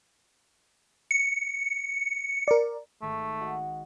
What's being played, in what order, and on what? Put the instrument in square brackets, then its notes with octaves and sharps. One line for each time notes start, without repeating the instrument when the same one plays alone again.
[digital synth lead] C#7
[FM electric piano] A#4 D5
[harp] G#1 C#6 F6 [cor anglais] A3
[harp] F#4 D#5 F#5